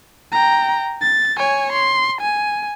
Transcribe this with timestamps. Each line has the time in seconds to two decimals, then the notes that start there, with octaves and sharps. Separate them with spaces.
0.32 G5 A#5
1.01 A6
1.37 C#5 G#5
1.72 C6
2.21 G#5